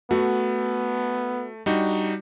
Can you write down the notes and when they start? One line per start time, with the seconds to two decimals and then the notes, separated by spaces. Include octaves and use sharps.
0.11 A3 B3 F#4
1.66 G3 D4 D#4 F#4